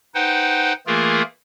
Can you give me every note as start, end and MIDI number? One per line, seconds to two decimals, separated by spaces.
0.15 0.73 63
0.15 0.73 71
0.15 0.73 72
0.15 0.73 78
0.15 0.73 79
0.87 1.22 52
0.87 1.22 57
0.87 1.22 58
0.87 1.22 65
0.87 1.22 68
0.87 1.22 70